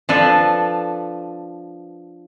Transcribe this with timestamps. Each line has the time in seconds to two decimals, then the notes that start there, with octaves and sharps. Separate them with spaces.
0.09 F3 D4 A4 B4